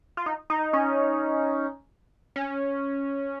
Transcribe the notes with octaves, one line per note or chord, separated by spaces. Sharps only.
F4
D#4
D#4
C#4
C#4